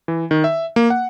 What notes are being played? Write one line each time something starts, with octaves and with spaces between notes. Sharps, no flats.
E3
D#3
E5
A#3
F#5